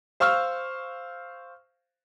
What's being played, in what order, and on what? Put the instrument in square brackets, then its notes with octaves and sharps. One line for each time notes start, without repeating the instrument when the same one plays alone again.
[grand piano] C5 F5 C#6 E6 F6